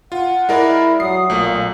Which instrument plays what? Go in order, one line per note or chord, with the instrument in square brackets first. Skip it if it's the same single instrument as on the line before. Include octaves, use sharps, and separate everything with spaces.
[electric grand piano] F4 [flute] F#5
[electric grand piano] G#3 A#4 D5 [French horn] E4
[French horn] F#3 [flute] D#6 [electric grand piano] C7
[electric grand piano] B1 A3 [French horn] A#2